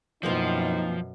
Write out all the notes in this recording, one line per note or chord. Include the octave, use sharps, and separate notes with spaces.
F#2 B2 E3 F3 A#3 C4 D#4